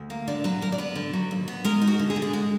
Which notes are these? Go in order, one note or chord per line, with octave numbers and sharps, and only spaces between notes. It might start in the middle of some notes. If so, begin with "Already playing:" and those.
Already playing: D2
A#3
D3 D5
F#3 B4
D#2 A#4
D5
B3 B4
D3
F#3
D#2
B3
G#3 A#4
D#4
F#4
D3
G#4
D3
G#4
G#3 F#4